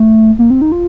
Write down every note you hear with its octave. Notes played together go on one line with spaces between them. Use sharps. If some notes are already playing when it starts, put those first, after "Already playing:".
Already playing: A3
A#3
C4
D#4
F4